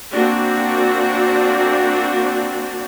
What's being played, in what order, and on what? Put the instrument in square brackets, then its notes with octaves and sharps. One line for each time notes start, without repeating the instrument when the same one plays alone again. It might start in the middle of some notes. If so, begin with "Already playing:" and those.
[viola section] A#3 C4 D4 F#4